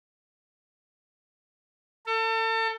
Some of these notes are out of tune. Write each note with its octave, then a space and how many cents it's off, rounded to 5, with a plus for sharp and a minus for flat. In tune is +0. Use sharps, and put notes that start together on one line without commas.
A4 +35